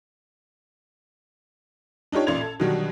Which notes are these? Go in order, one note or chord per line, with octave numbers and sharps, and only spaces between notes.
D4 D#4 F4 G4 C#5
A1 A#2 D5 G#6 F7
A4
B2 D3 D#3 F#3 G3 D4